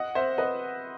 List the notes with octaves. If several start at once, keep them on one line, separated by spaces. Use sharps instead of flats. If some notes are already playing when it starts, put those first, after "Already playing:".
Already playing: D#5 F#5
C5 E5
B4 D#5